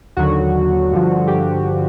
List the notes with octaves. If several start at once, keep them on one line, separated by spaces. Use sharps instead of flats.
D#2 D3 F#3 F#4
G2 D3 F3
G4